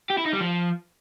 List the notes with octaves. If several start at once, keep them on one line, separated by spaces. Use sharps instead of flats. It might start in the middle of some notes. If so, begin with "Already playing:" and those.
G4
E4
D#4
G3
F3